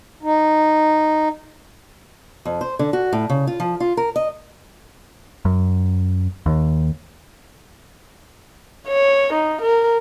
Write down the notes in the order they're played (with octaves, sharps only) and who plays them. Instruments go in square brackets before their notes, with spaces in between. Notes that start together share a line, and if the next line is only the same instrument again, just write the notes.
[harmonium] D#4
[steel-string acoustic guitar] F2
C5
D3
F#4
A2
C#3
F4
F3
F4
A#4
D#5
[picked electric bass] F#2
D#2
[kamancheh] C#5
D#4
A#4